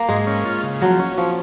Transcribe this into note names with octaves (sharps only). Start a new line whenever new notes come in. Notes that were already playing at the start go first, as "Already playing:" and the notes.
Already playing: A#3
G#2 G#3
C#4
F4
C#3
F3 F#3
C#4
F3 C#4